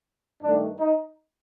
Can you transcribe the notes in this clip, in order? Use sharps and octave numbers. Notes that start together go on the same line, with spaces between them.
G2 D#3 A3 D4
D#4